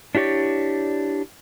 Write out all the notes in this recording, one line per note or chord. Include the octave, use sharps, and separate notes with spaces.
D4 E4 G4 C#5 D5